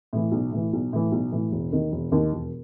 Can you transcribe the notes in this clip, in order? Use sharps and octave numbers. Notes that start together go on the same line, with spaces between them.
A2 E3
B1
A2 E3
B1
A2 E3
B1
A2 E3
E1
D#2 D#3
E1
D#2 D#3
E1